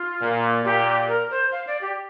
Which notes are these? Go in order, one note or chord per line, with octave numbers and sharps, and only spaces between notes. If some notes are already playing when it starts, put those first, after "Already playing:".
Already playing: F4
A#2
A#2 G4
A#4
C5
F5
D5
G4